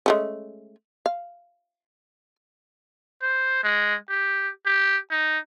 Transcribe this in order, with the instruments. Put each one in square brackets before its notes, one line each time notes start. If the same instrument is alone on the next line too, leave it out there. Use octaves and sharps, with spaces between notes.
[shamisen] G#3 A3 C#4
F5
[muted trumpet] C5
G#3
G4
G4
D#4